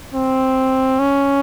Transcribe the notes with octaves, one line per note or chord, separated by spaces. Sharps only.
C4
C#4